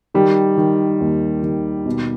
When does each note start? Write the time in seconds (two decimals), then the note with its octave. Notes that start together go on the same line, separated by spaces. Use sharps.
0.14 D#3 G3
0.58 D#3
1.00 D#2
1.43 D#3
1.86 B2